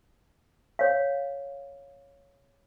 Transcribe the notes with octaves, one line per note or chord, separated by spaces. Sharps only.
C#5 F5